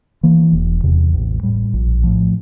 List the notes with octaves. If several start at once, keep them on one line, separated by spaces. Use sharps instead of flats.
E3 A#3
E1
E2 C3
A1
A2 G3
A#1
A2 F3